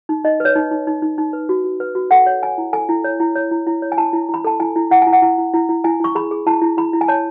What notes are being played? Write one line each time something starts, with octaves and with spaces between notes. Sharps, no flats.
D#4
D#4 D#5
B4 C#5
D#4
D#4
D#4
D#4
D#4
B4
F#4
F#4
B4
F#4
A4 F#5
C#5
C#5 G#5
E4
A4 G#5
E4
C#5
E4
C#5
E4
E4
C#5
G#5
E4 A5
E4
E4 B5
A4 A5
E4 G#5
E4
E4 F#5
E4 G#5
F#5
E4
E4
E4
E4
E4 G#5
E4 C#6
G#4 B5
G#4
E4 A5
E4
E4 B5
E4
G#5
C#5 A5